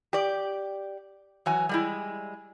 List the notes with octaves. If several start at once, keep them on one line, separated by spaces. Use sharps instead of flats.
G4 D5
E3 F#3 G#5
G3 G#3 E4